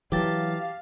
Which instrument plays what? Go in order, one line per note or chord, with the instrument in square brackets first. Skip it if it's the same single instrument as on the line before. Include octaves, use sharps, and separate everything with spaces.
[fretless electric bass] E3 F#3 [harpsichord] G4 A5 [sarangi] F5